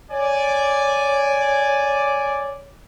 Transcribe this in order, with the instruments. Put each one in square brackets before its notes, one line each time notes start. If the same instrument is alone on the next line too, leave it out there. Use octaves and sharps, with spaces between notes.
[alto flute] C#5 [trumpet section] D5 G#5